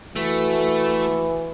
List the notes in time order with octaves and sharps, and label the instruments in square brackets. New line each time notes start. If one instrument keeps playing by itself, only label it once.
[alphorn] E3 [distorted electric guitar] A3 [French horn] F#4